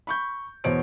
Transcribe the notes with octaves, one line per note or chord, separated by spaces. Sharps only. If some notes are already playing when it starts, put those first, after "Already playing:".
B5 C#6 G6
E2 B2 C5 C#5 D7